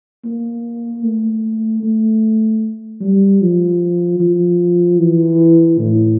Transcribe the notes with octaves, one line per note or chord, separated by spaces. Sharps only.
A#3
A3
A3
G3
F3
F3
E3
A2